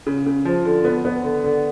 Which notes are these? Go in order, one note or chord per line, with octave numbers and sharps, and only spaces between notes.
C#3
C#3
F3
D3
B3
B3
D3
D3